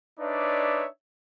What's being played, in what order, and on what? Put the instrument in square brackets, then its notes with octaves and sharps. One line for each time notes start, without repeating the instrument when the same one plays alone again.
[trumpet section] D4 D#4 B4 C#5 D5 E5